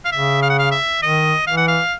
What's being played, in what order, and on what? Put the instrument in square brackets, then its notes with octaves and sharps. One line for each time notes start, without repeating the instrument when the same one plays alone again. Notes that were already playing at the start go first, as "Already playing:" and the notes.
[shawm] F5
[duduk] C#3 [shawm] E5
[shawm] F5
F#5
F5
E5
[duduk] D#3 [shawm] D#5
[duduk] E3 [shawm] F5
[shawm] F#5
F5